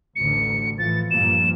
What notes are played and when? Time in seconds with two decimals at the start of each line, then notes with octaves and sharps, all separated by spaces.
0.16 A1 D2 D3 C#7
0.78 A2 E3 F3 A6
1.11 G2 A#2 F3 E7